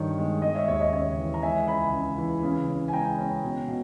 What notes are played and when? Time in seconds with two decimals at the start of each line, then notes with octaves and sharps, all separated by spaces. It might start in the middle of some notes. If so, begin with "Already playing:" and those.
Already playing: G2 D#3 D#4 C#5
0.18 G#3
0.42 G#3 D#5
0.55 C#5 E5
0.67 D#2 C#5 E5
0.81 D#5
0.92 C#3 C#5 E5
1.17 E3
1.34 A#5
1.42 G#3 E5 G#5
1.67 C#2 G#5 B5
1.93 C#3
2.18 E3
2.43 C#3
2.68 C#3
2.88 G#5
2.93 G#3 G5 A#5
3.18 C#4
3.43 B2
3.68 B2